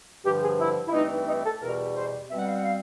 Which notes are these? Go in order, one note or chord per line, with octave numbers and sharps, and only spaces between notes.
G2 D3 F3 G4
G#4
E4
E4
G2 E3 A3 C4 D#4
D#4
A4
E2 B2 G3 A#4
C5
B2 G3 C4 E5
F#5
F5
F#5
F5